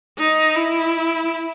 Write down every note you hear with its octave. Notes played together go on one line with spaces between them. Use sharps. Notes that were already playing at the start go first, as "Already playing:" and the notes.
D#4
E4